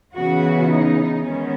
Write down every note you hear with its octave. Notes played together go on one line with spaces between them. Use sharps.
C#3 E3 B3 F#4
D#4
D#3 G#3 B3 C#4